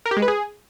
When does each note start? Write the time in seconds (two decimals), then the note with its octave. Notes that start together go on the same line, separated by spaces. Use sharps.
0.06 A#4
0.11 G4
0.17 G#3
0.22 B4
0.28 G#4